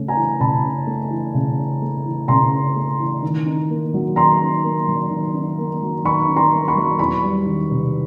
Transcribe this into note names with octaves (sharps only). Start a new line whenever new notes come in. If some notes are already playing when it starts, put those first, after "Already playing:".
Already playing: C#3 A3 C#4
G#5 A#5
E3
C#3 A5 B5
C#4
A3
E3
C#3
C#4
A3
E3
C#3 A#5 C6
C#4
A3
E3
D#3
D#4
A#3
F#3
D#3 A#5 C6
D#4
A#3
F#3
D#3
D#4
A#3
F#3
D#3 B5 C#6
D#4
A#5 C6
A#3
B5 C#6
F#3
E2 B5 C#6
G3
D#3
C3